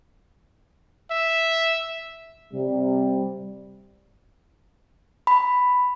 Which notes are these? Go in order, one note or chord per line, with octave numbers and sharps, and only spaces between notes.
E5
C3 G3
B5